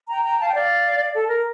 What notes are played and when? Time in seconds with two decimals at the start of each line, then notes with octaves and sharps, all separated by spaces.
0.09 G5 A#5
0.24 G5 A#5
0.39 F5 A5
0.48 G5
0.54 D5 F5
1.14 A4
1.29 A#4